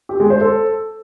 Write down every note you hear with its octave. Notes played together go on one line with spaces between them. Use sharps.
G4
G#3
C5
A4